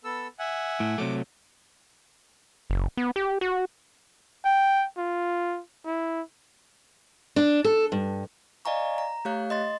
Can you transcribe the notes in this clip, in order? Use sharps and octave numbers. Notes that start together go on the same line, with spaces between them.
B3 A4 E6
E5 F#5 G#5
A2
C3 F#3 A3 D6
F#1
B3
G4
F#4
G5
F4
E4
D4
A4
G2
D5 D#5 F5 G#5 A#5 C#6
A#5
A3 G4 C#5 F5 F#6
D#5 C6 A6